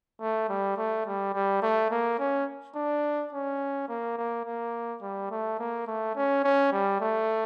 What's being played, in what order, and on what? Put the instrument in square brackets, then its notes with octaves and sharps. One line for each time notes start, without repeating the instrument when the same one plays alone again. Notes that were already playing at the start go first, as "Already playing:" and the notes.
[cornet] A3
G3
A3
G3
G3
A3
A#3
C#4
D4
C#4
A#3
A#3
A#3
G3
A3
A#3
A3
C#4
C#4
G3
A3